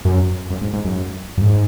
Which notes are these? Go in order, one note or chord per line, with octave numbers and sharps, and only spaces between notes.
F#2
F#2
G#2
G#2
F#2
F#2
G#2